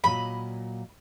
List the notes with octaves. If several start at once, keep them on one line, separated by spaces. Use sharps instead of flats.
A#2 F#3 D#5 B5